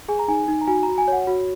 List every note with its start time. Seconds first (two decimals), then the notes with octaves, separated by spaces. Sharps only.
0.09 G#4 G#5
0.19 A#5
0.28 D#4 G#5
0.48 D#4
0.61 A#5
0.67 F#4 G#5
0.83 A#5
0.88 F#4
0.98 G#5
1.08 C#5 F#5
1.27 F#4